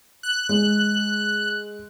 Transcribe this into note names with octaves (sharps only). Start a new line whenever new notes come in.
F#6
G#3